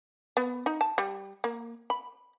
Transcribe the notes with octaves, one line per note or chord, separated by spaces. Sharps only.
B3
D#4
A5
G3
A#3
B5